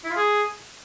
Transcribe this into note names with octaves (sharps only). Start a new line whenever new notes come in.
E4
F4
G#4